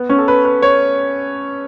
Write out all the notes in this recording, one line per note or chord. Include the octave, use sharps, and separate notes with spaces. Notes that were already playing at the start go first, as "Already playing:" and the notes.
Already playing: B3
C#4
A4
B4
B4
C#5